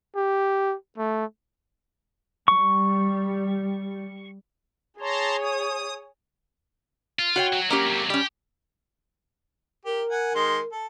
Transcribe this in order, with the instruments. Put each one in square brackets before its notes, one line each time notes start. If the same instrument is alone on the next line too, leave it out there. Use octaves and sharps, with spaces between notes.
[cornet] G4
A3
[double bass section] G3 [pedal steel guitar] C#6
[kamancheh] G#4 C#5 [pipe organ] A5 A#5 C6
[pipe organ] D#6
[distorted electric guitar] F4
[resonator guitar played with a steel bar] F#4 C#5 G5
[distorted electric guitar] F#3
[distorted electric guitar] F#3 [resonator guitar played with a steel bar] A#3 C#4 G4
[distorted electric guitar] C3 F#3
[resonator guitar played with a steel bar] G3 C#4 [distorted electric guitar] G4
[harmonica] G4 [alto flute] A#4
[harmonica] F#5 G#5
D#3 G#3 C6
A4